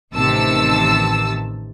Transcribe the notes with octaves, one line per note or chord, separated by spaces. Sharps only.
A1 C3 D#3 A5 E6